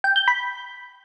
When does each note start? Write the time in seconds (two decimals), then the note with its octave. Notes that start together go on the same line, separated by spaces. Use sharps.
0.04 G5
0.16 G6
0.28 B5